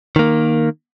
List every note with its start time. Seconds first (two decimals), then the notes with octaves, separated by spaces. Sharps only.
0.16 D#3 A#3